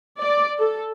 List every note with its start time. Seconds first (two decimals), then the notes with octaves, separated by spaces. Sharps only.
0.20 D5
0.59 A4